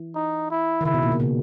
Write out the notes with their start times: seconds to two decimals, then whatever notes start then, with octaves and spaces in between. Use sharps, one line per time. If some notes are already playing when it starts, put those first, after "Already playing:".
Already playing: E3
0.15 D#4
0.51 E4
0.81 D#3
0.85 C#3 E4
0.94 B2
1.03 A#2
1.12 B2
1.20 C#3